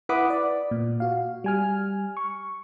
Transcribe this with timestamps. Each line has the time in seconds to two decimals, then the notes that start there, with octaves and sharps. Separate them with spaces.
0.09 E4 B4 F#5 B5 D6 D#6
0.30 D5
0.71 A#2
1.00 F#4 F5
1.44 G3 G#5 F6
2.17 C#6